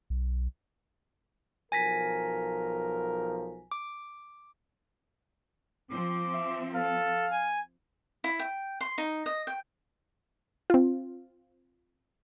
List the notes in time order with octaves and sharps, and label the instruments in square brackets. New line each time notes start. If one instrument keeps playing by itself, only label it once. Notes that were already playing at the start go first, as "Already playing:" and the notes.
[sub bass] B1
[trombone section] B1 F3 A#4 [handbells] G#5 A#6 B6
[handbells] D6
[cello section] F3 C4 [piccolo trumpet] D6
[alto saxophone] E5
[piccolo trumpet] A4 [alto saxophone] F5
[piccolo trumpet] G#5
[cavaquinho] E4
G5
C6
D#4
D#5
G5
[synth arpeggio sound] C4 F4